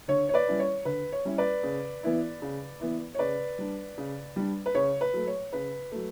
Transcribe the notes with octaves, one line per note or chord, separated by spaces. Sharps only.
D3 C#5
C#5
B4 D5
G3 C#4 E4
C#5
D3 B4
C#5
G3 C#4 E4
B4 D5
C#3
E3 B3 E4
C#3
E3 B3 E4
C#5
C#3 B4 D5
G3 D4
C#3
G3 D4
B4
C#3 C#5
B4
F#3 A3
C#5
C#3 B4
F#3 A3